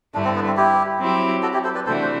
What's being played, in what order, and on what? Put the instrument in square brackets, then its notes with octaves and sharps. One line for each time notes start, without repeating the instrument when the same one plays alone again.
[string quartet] G2 D3 A3 E4 [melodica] D4
[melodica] C4
B3
C4
E4 G4
[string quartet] F#3 C4 E4 G4
[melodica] F#4 A4
E4 G4
A4 C5
B4 D5
[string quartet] C3 E3 A3 D4 F#4 [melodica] A4 C5
[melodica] C5